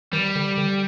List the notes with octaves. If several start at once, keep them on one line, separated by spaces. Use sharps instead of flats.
D#3 G3
D3
D3